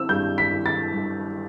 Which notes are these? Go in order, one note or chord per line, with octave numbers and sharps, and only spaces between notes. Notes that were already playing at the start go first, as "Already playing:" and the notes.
Already playing: C4 E4 E6
G2 G6
B6
E4
A6
G2